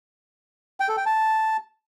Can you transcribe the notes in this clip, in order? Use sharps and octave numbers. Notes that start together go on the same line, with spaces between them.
G5
A4
G5
A5